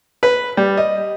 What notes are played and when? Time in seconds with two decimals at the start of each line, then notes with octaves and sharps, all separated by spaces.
0.23 B4
0.57 G3
0.77 D#5